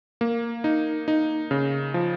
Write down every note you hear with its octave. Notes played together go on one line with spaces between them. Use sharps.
A#3
D#4
D#4
C#3
F3